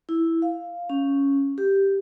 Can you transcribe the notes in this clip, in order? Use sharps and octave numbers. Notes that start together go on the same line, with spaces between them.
E4
F5
C#4
G4